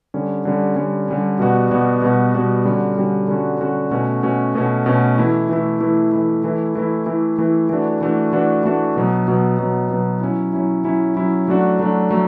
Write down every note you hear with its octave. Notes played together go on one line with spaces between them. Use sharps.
D3 G3 C#4
D3 G3 C#4
D3 G3 C#4
D3 G3 C#4
B2 G3 B3 F#4
B2 G3 B3 F#4
B2 G3 B3 F#4
B2 G3 B3 F#4
D3 G3 C#4 F#4
D3 G3 C#4 F#4
D3 G3 C#4 F#4
D3 G3 C#4 F#4
B2 A3 C#4 F#4
B2 A3 C#4 F#4
B2 A3 C#4 F#4
B2 A3 C#4 F#4
E3 A3 E4
E3 A3 E4
E3 A3 E4
E3 A3 E4
E3 A3 E4
E3 A3 E4
E3 A3 E4
E3 A3 E4
E3 A3 D4 F#4
E3 A3 D4 F#4
E3 A3 D4 F#4
E3 A3 D4 F#4
B2 F#3 B3
B2 F#3 B3
B2 F#3 B3
B2 F#3 B3
F#3 C#4 E4
F#3 C#4 E4
F#3 C#4 E4
F#3 C#4 E4
F#3 A3 D4 F#4
F#3 A3 D4 F#4
F#3 A3